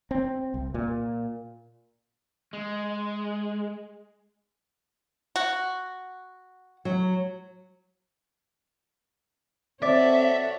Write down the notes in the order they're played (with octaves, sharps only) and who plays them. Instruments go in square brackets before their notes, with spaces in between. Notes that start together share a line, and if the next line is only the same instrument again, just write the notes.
[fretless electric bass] C4
C2
A#2
[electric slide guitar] G#3
[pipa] F#4
[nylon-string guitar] F#3
[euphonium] C4 [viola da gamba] F#4 A4 C#5 [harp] D5 [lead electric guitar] E5